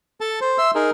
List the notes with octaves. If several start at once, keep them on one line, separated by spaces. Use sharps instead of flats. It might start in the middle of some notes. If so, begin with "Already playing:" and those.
A4 A5
C5
E5 C6 E6
D#4 G#4 A#4